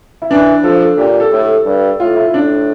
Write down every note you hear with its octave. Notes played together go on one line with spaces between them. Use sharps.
E4
E3 D4
F3 A4
A4
A#2 G4
A4
A2 A4
G2
A2 F4
E4
A2 D4